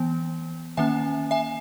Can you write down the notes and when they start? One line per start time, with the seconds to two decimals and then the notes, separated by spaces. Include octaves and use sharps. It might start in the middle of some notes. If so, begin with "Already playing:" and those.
Already playing: E3 B3
0.77 D#3 A#3 C#4 E5 G#5
1.31 E5 G#5